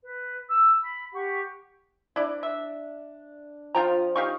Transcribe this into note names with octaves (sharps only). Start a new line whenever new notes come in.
B4
E6
B5
G4 F#5 C#6
D4 E4 D5
E5
F3 F4 G5 A#5
D#4 G4 F5 C#6